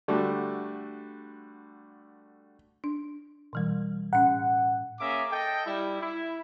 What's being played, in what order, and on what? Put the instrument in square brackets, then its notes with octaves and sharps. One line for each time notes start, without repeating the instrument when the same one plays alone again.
[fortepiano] D3 G3 A3 F#4
[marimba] D4
B2 E3 G3
[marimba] A2 C#4 [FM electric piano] F#5
[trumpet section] A#3 C#4 G#4 E5 A#5 D6
A4 D#5 G5
G3 E4
E4